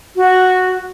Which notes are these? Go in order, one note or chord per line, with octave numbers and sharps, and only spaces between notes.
F#4